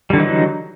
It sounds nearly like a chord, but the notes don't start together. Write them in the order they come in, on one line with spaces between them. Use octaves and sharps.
G3 D3 E3 D#4 F#3